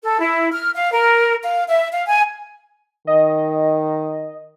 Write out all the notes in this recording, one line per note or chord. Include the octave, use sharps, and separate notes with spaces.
A4
E4
F6
F5
A#4
F5
E5
F5
G#5
D#3 D#5